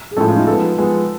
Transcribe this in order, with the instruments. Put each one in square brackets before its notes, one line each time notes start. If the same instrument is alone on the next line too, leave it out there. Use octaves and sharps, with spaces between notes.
[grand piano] G#4
[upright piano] A2 F3 G#3 C#4 [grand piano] A4
[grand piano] F4
D#4
[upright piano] F3 G#3 B3 [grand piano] A4
[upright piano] F3 G#3 B3